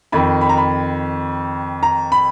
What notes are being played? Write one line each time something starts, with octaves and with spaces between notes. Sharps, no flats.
F2 D#3 B5
B5
A#5
B5
A#5
B5